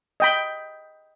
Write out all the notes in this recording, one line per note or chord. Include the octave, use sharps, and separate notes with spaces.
D#5 G5 B5